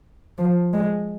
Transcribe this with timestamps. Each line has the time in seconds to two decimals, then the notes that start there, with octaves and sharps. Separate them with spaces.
0.38 F3
0.73 G#3